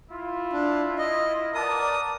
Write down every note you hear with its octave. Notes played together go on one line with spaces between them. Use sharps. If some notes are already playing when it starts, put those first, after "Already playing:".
E4 F4
D4
D#5
A#4 B4 D5 F#5 A5 D#6